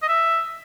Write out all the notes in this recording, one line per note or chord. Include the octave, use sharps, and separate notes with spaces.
D#5
E5